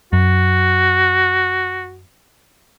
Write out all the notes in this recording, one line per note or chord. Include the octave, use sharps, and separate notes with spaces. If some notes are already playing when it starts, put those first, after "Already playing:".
F#2 F#4